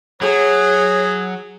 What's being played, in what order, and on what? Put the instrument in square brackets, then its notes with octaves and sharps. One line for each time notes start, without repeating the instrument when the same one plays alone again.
[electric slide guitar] F#3 [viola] G#4 [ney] C#5